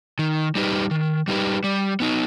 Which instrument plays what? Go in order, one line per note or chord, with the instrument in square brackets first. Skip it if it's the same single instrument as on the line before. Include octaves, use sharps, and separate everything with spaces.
[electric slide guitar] D#3
G3 D#4 G4 B4
D#3
G3 D#4 G4 B4
G3
B3 D#4